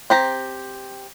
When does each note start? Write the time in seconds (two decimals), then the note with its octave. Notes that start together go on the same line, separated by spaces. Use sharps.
0.10 C4 G4 A#5